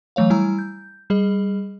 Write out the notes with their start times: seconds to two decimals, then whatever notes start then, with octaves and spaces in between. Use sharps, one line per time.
0.16 E3 F#3 A3 C#5 F5
0.30 G3 E4 G#5 A#5 E6
0.59 G6
1.10 G3 G#4 D#5